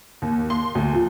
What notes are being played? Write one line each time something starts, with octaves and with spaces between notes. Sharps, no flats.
D#2
C6
D2
F3